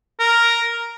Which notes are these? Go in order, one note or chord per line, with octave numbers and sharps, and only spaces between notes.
A#4